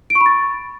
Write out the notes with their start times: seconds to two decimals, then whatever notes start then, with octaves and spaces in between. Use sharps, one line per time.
0.10 D7
0.15 C#6
0.21 B5
0.26 A6